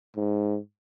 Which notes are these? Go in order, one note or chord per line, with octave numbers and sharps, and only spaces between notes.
G#2